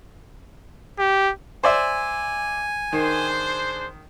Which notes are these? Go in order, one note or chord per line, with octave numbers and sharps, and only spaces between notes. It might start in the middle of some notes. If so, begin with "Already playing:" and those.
G4
C5 D5 E5 G#5
D#3 D4 G#4 C5